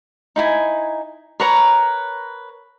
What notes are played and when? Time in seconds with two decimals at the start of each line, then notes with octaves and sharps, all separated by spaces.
0.36 D#4 E4 G#5
1.40 A#4 B4 C#5 A#5